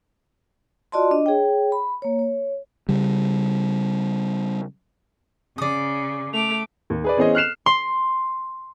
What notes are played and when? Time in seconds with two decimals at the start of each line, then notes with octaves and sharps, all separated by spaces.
0.92 F4 F#4 D5 D#5 A5 C6
1.11 D4 D#5
1.26 G#4 C#5 G5
1.72 B5
2.02 A#3 C#5
2.19 C#5
2.89 C#3 G3
5.58 C#3 D5 D#6
6.33 A3 D6 F7
6.90 D#2
7.04 G#4 B4 D5
7.17 E3 B3 C#4 G#4 C5 D#5
7.35 F6 F#6 C7 E7 F7
7.66 C6